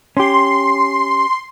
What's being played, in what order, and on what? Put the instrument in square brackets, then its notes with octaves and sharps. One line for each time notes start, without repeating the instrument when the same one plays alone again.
[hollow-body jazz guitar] C#4 G4 [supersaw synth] C6